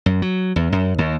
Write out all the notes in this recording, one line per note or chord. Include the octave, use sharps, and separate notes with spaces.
F#2
F#3
E2
F#2
D#2